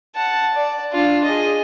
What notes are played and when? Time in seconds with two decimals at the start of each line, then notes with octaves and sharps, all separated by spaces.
0.15 F#5 A5
0.54 D5
0.93 D4 F4
1.24 G#4 D#5